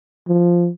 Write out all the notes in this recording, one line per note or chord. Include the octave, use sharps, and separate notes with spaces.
F3